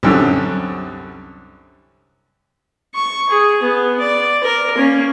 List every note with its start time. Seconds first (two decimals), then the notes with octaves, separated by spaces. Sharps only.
0.03 C2 F#2 D3
2.94 C#6
3.29 G#4
3.62 B3
4.00 D5
4.43 A#4
4.76 A#3 C#4